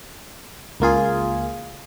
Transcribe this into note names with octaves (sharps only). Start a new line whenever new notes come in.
C#2 A#3 F4 G#4